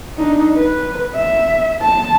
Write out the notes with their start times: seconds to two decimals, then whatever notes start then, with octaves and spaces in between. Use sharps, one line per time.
0.17 D4 D#4
0.56 B4
1.15 E5
1.82 A5